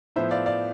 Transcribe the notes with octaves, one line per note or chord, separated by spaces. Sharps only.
A2 F3 B3 C5 E5
D5 F5
D5 F5